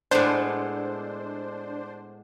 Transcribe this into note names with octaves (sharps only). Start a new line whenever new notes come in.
A2 G#3 B3 D4 C5